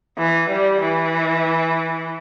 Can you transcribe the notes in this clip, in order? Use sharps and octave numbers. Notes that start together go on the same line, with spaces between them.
E3
G3
E3